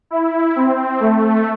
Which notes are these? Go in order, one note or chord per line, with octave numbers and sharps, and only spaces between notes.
E4
C4
A3